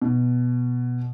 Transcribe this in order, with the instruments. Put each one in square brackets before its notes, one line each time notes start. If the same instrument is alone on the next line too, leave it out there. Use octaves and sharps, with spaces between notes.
[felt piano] B2